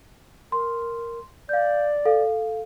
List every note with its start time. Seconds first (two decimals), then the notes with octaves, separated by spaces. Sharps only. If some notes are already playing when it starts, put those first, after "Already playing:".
0.52 A#4 C6
1.49 D5 F5 G6
2.06 A4 F5